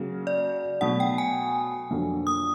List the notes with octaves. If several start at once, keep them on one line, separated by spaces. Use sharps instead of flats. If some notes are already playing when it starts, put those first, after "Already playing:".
Already playing: C#3 F#3 A#3
D5
B2 F#3 A3 F#5
G5
G#5
F2 D3 F#3 A#3
D#6